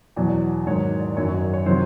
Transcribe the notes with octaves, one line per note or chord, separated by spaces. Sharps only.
E2 B2 F#3 D5
G#2 D#3 F#3 C#5
D5
F#2 D#3 F#3 C#5
C#5
D5
C#5
C3 D#3 F#3 C5